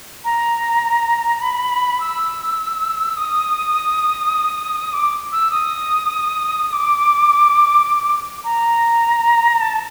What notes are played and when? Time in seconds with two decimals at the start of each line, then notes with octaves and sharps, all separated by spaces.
0.25 A#5
1.42 B5
2.00 E6
3.17 D#6
4.93 D6
5.32 E6
5.51 D#6
6.68 D#6
6.72 D6
8.44 A#5
9.61 A5